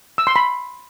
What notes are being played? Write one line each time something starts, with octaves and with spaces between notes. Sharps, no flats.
E6
C6
B5